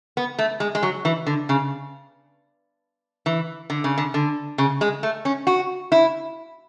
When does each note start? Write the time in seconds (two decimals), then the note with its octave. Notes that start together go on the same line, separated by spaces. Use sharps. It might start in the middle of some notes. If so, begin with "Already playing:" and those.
0.17 B3
0.39 A3
0.60 G#3
0.75 G#3
0.83 F#3
1.05 E3
1.26 D3
1.49 C#3
3.26 E3
3.70 D3
3.84 C#3
3.98 D3
4.14 D3
4.58 C#3
4.81 G#3
5.03 A3
5.25 C#4
5.47 F#4
5.92 E4